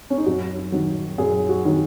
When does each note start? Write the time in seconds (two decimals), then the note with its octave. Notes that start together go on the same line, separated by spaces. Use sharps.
0.10 C#4
0.18 D#4
0.26 F#2 F#4
0.72 D#3 F#3
1.18 F#2 G#4
1.49 F#4
1.65 D#3 F#3